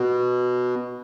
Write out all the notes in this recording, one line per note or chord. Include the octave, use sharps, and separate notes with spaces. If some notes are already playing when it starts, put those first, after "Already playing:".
Already playing: B2